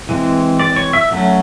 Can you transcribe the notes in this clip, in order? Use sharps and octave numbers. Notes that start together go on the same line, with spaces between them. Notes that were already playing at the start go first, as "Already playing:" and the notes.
E3 G#3 C4
D5
C#5
E5
F#3 A3 C#4